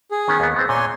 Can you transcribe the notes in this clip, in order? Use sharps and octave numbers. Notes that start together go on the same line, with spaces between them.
G#4
D#3 B3 C#4
D#2 B3
B3 C4 C5
A#2 C#5 G#5 C6